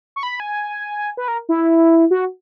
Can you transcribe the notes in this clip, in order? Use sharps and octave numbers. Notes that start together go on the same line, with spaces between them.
C#6
B5
G#5
B4
A#4
E4
F#4